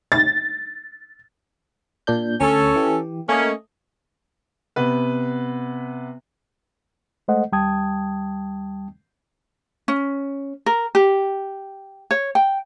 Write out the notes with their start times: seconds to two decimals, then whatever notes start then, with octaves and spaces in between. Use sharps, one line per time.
0.12 A6
2.07 A#2 D4 G6
2.41 D2 C#4 A4 C#6
2.76 E3 G4
3.29 A3 A#3 C#4 D#5
4.76 C3 B3 B4
7.28 G#3 A3 A4 C5 D#5 F#5
7.52 D#2 G3 G5 A5 D#6 G#6
9.88 C#4
10.66 A#4
10.95 G4
12.11 C#5
12.35 G5